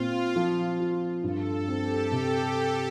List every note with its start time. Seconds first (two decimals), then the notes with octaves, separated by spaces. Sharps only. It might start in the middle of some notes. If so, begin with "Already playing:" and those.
Already playing: A#2 C4 F4
0.36 F3
0.80 F4
1.24 G2 A4
1.53 A4
1.68 C4
1.82 G4
2.12 C3